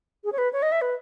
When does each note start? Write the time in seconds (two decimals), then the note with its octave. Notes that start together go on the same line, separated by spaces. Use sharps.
0.25 G#4
0.32 C#5
0.38 B4
0.53 C#5
0.62 D#5
0.72 E5
0.81 B4